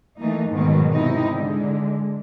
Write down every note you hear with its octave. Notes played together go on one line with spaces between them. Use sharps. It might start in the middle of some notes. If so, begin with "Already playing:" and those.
E3 A3 A#3 D#4
G#2 B2 D#3 F#3
C3 D#4 E4
D3 G#3